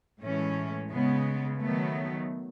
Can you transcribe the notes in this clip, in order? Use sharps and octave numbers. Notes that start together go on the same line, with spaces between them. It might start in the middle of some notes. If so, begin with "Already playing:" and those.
A2 E3 G#3 A3 C#4
C#3 G#3 B3
D#3 F#3 A3 B3